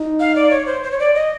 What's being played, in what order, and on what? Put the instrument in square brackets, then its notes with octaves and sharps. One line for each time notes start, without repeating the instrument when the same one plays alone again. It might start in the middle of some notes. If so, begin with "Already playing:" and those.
Already playing: [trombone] D#4
[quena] F5
D5
C#5
C5
C5
C#5
D5
D#5